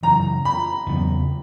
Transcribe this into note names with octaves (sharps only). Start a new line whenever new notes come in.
F#2 C#3 E3 A#5
B5
E2 C#3 F#3 B3